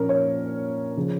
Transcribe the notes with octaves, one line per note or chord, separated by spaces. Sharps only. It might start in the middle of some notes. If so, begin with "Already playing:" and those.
Already playing: A#2 F3 C#4 A#4
C#5
C#3 F3